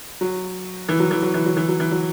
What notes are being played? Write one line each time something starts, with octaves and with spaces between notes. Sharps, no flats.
F#3
E3
F#3
E3
F#3
E3
F#3
E3
F#3
E3
F#3